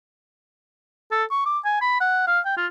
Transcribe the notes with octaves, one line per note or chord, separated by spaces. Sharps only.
A4
C#6
D6
G#5
B5
F#5
F5
G5
F4